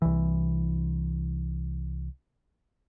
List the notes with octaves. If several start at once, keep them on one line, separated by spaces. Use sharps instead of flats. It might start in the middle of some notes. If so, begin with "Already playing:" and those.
C2 E3